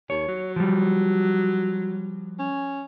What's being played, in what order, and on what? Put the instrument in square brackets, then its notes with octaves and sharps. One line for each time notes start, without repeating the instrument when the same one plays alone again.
[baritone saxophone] D#2 [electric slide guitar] C#5
[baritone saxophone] F#3
[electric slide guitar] F3 G3
[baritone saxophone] C#4